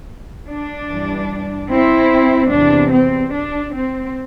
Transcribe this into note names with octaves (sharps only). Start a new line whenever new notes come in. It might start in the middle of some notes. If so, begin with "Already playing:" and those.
D4
G2 E3 G3
C4 E4
E2 C3 E3 D4
C4
D4
C4